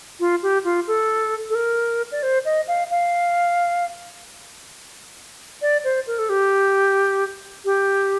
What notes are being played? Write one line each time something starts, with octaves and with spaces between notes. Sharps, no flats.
F4
G4
F4
A4
A4
A#4
D5
C5
D#5
F5
F5
D5
C5
A#4
A4
G4
G4